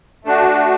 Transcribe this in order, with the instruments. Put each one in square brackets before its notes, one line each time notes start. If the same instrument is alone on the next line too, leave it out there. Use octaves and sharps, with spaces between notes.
[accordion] A3 D4 F#4